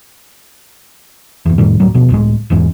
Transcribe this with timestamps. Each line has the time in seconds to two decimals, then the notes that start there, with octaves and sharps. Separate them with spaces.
1.46 F#1 E2
1.58 F2 A2 D#3 G3
1.80 D2 A2 F#3 G3
1.94 D#1 B2 F3
2.10 C#2 A2 G#3
2.50 E1 E2 G#2 C#4